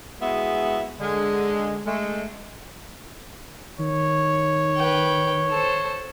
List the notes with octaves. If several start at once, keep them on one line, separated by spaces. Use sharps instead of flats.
G#3 B3 E4 F#4 G#4 E5
D3 G#3
G#3 A3
D#3 C#5
B4 G5
A4 C5